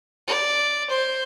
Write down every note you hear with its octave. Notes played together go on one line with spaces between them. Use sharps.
D5
C5